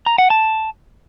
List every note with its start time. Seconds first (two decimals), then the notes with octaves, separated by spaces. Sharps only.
0.06 A#5
0.18 F#5
0.30 A5